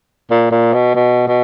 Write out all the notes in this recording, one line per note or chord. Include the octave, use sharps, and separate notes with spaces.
A#2
A#2
B2
B2
B2